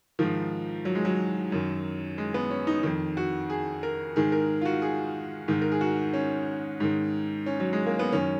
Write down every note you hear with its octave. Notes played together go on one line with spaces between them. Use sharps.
G#2 D#3 F3
F#3
G#3
F#3
F#2 D#3
G#3
B3
C#4
D#4
F2 D#3
F#4
G#4
A#4
G#2 D#3 G#4
A#4
F4
F#4
G#4
G#2 D#3
A#4
G#4
F#4
C#4
G#2 D#3
C#4
F#3
G#3
A#3
B3
F#2 D#3 C#4